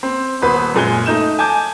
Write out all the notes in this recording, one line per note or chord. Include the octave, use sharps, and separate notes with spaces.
C4
D#1 B3 B4 C5 C6
F#2 A#2 G#3 G#5 F#6 G7
A3 D#4 G6 E7
G#5 A5 D6 G6